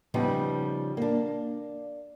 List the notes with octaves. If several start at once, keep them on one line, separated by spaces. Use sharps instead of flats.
C#3 F3 G3 B3 D#4
A#3 D4